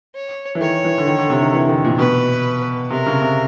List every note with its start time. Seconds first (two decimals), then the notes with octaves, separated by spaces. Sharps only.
0.15 C#5
0.55 E3
0.61 D#3 C#5
0.84 E3
0.98 D3
1.08 D#3
1.18 D3
1.30 C3
1.42 D#3
1.53 E3
1.69 D#3
1.84 A#2
1.99 B2 B4
2.91 C3 A#4
3.06 C#3
3.22 C3